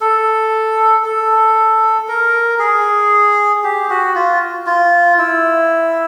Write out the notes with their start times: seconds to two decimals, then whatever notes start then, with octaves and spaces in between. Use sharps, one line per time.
0.01 A4
1.04 A4
2.08 A#4
2.59 G#4
3.64 G4
3.90 F#4
4.15 F4
4.67 F4
5.19 E4